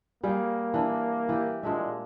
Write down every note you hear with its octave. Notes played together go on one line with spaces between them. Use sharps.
G3 A#3 G#4 F5
E3 D4
E3 G4
A#2 G#3 D4 E5